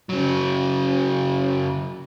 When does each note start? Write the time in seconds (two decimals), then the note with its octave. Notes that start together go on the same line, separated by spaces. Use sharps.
0.09 C#3 F#3